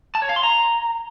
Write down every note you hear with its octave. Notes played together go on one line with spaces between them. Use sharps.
A5
C#5
F5
C6
A#5